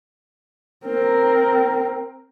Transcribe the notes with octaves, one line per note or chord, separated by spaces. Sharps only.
C4 A#4